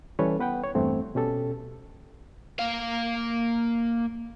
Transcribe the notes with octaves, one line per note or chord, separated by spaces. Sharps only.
E3 G3 C#4 A4 B4 C#5
B3 B4 F#5 G5
C#5
E2 G2 A3 C4
B2 C#4 G4 A4
A#3 F5